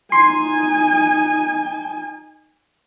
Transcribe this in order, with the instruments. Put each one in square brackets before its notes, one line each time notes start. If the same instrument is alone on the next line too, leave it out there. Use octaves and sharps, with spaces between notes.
[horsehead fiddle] D#4 G#5 [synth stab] C6